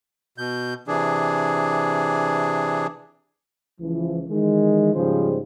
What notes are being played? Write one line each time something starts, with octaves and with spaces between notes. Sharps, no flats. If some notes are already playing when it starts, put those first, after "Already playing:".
B2 G6
C3 E3 D4 G#4
C#2 E3 F3
D#3 E3 G#3
G#2 C#3 F3 G3 G#4 C5